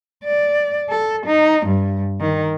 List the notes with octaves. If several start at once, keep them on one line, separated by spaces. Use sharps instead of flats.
D5
A4
D#4
G2
D#3